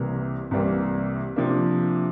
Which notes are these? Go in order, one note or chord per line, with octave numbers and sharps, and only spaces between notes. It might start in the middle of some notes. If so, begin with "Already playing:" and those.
Already playing: C2 C3 E3 G3 A#3
C2 C3 E3 G3 A#3
C3 F3 A#3 D4